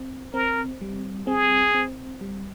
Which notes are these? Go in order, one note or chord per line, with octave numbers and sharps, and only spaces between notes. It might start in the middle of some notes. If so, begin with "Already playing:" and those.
Already playing: C4
C4 A#4
G3
C4 G#4
C4
G3